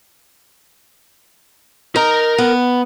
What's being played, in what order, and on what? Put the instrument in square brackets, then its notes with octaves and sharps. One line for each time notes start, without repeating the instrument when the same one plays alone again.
[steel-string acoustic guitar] D#4 [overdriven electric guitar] A#4 A#5
[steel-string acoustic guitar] B3